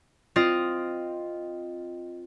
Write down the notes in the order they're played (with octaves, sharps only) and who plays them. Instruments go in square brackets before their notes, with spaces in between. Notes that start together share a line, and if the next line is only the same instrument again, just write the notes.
[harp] C4 F4 D#5